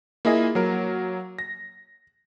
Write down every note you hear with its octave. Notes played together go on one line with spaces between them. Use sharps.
A#3 E4 F4 G#4 D#5
F#3 A#3 A#4
A#6